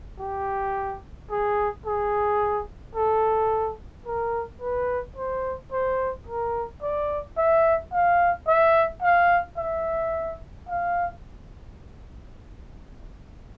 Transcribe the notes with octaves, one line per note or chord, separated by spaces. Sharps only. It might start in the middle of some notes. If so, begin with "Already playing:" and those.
G4
G#4
G#4
A4
A#4
B4
C5
C5
A#4
D5
E5
F5
E5
F5
E5
F5